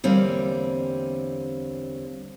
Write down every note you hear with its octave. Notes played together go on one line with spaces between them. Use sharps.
E2 D3 G3 A#3 C4 C#4